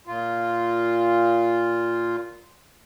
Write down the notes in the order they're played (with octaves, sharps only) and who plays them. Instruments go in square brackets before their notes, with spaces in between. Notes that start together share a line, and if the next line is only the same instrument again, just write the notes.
[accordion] A#2 F4